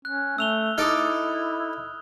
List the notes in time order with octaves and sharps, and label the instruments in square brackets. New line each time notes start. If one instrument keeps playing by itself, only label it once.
[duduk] C#4 [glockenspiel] F#6
[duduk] A3 [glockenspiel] E6 F7 G7
[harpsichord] D#4 A4 D6 [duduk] E4 [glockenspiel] D#6 F6